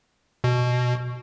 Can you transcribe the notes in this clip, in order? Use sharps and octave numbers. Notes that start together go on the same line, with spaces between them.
B2